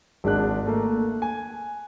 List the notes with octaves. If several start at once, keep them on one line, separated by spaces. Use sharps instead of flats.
G#1 G#3 D4 F#6
A3 A#3
G#5